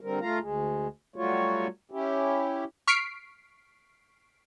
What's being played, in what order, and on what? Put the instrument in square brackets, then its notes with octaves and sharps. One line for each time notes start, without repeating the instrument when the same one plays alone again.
[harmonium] D3 G3 C4 A#4
A3 F4 F5 A#5
D2 G#3
F#3 G3 A3 F4 F#4 C#5
C#4 E4 G4
[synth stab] C#6 F6 B6 C7 D7